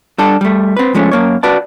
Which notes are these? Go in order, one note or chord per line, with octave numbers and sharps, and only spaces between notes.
G3 D4 A4
G3 A3
C4 B4
F3 G#3 A3 C#4
F#2 A#3 C#5
F#4 B4 D5 A5